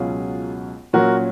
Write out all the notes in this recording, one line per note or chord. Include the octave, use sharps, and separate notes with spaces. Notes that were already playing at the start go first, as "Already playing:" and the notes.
Already playing: C#2 B2 F#3 C#4 F4 G#4
A#2 F#3 C#4 F#4 A#4